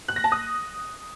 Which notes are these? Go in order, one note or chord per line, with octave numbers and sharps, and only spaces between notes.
F#6
A#6
A5
D#6